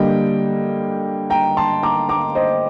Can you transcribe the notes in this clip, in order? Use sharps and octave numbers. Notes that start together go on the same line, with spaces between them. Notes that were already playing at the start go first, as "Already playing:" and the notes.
Already playing: D3 G3 A#3 D#5 G5
G5 A#5
A5 C6
A#5 D6
A#5 D6
C5 D#5